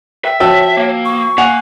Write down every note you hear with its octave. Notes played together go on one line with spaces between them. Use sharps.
E5 G5
F3 F#4 C#5 G5 A5 E6
A#3
C#6
A#3 F#5 G#5 F7